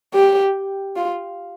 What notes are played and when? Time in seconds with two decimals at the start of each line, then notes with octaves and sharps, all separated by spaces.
0.14 G4
0.96 F4